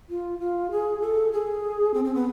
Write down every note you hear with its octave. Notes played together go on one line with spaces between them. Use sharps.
F4
F4
G#4
A4
G#4
C4
C4
B3